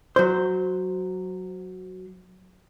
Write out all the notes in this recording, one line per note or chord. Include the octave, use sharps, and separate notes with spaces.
F#3 C5